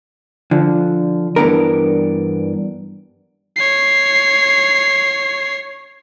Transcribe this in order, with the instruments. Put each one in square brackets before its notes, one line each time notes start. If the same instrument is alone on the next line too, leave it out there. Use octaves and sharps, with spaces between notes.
[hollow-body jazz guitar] D3 F3
G2 E3 B3 D4 A#4
[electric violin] C#5 C7